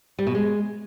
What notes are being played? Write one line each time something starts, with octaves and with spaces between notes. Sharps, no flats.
G3
B2
G#3